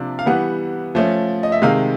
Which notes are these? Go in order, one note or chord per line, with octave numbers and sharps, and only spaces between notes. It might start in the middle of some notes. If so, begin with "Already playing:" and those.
Already playing: C3 F3 A#3 D4
F5
E3 G3 B3 F#5
F3 A3 C#4
D#5
E5
C3 D#3 G#3 F5